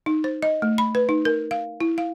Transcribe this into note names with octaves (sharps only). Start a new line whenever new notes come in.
D#4
C5
D#5
A3
B5
B4
D#4
A#4
F5
E4
F5